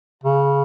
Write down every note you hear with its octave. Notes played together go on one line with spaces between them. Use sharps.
C#3